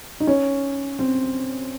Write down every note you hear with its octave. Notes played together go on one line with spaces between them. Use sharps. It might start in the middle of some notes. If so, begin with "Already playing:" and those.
D#4
C#4
C4